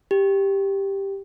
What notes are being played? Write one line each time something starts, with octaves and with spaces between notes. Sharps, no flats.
G4